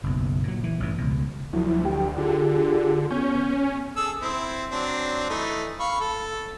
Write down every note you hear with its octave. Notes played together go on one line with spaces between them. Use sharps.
F#1 B1
A#2 F#3
E3
A1 G2 E3
C#2 B2
D2 F3 F#3 E4
G4 G5
D3 F4 G4 G#4
B3 C#4 C#6 G6
G#4 A4 E6
C4 E4
F#3 C4 D4
E3 A3 D#4
F5 B5 C#6
A4